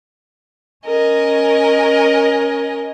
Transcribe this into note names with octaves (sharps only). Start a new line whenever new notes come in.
C#4 A#4 D#5 G#5